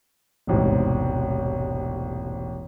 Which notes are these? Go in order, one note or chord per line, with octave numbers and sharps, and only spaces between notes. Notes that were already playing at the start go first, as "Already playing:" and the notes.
E1 A1 G#2 C3